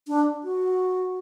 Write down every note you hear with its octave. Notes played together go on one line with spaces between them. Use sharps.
D4
F#4